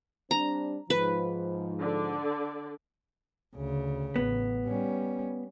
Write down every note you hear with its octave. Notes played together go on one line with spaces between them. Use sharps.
G3 C4 D4 A#5
G#2 F3 B4
D3 D5
D2 C#3
A1 B3
G3 C#4